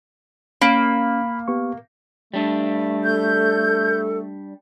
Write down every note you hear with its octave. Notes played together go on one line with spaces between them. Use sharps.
A#3 C#4 B5
B3 G4 C#6
G3 A3 D4
A4 G6